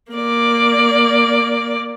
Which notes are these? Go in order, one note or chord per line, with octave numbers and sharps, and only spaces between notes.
A#3 D5